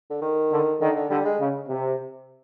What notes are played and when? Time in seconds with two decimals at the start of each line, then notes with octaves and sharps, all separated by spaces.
0.10 D3
0.22 D#3
0.51 D3
0.81 D3 D#3
0.96 D3
1.10 D3 G3
1.24 G#3
1.39 C#3
1.68 C3